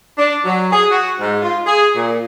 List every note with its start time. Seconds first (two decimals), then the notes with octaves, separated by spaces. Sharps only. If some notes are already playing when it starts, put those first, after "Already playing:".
0.18 D4
0.44 F#3
0.72 G#4
0.90 F#4
1.18 G#2
1.42 F4
1.66 G#4
1.95 A#2